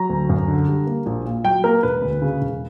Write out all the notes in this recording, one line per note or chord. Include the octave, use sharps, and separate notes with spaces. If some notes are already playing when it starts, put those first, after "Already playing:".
Already playing: F#3 A#5
D2
F#2
D3
G3
A#3
A#1
A#2
F#3 G5
A#3 A#4
E1 B4
D2
C#3
E1